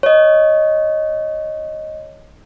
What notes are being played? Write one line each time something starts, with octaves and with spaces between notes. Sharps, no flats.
C#5 D#5